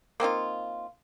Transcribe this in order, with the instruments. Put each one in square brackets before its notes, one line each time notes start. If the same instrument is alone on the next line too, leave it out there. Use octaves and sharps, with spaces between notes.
[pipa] A#3 C4 D#4 F4